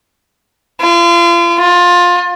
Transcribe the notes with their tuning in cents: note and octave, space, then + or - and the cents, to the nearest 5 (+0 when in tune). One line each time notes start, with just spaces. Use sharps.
F4 -35
F4 +20